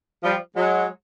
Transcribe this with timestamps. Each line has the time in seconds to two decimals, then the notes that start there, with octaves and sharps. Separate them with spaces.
0.23 F3 G3
0.56 F#3 G#3